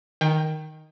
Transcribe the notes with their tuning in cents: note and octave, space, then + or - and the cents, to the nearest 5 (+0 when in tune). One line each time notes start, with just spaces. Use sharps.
D#3 +0 G5 +30